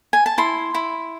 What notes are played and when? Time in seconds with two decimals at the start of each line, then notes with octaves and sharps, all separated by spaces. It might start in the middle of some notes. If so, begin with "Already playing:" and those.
0.13 G#5
0.26 A5
0.38 E4 C6
0.74 E4